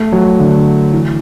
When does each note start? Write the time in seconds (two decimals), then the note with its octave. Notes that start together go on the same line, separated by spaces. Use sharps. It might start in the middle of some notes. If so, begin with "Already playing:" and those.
Already playing: A3
0.12 F#3
0.39 D3
0.93 E3